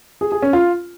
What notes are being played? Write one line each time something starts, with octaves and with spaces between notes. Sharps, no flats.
G#4
G#4
C#4
F4